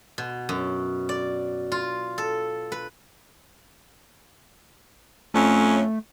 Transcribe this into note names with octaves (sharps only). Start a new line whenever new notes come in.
B2
F#2
D5
F4
A4
B4
F2 A3 C#4